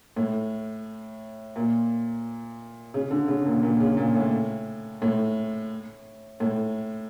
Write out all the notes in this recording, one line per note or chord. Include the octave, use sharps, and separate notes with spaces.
A2
A#2
C#3
D3
C#3
A#2
A#2
C#3
A#2
A2
A2
A2